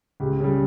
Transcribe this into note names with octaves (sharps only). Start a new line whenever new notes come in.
C#2 G4
C#3 G3